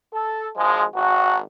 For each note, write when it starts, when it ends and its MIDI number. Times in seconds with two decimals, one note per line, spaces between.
0.13 0.48 69
0.57 0.85 32
0.57 0.85 53
0.57 0.85 56
0.95 1.39 32
0.95 1.39 66